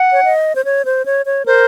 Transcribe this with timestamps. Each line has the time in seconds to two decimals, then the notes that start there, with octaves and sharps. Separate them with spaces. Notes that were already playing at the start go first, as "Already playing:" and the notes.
Already playing: F#5
0.12 C#5
0.24 D#5
0.55 C5
0.65 C#5
0.85 C5
1.06 C#5
1.26 C#5
1.46 A#4 C5